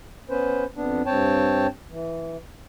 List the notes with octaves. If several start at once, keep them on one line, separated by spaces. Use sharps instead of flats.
B3 C#4 B4 C5
F2 B3 D4
G2 C4 C#5 G5 A5
E3